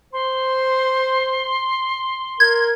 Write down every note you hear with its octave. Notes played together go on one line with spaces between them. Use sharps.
C5 C6
A#4 G#6